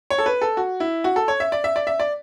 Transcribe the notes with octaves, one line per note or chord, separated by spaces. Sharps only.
C#5
A4
B4
A4
F#4
E4
F#4
A4
C#5
E5
D5
E5
D5
E5
D5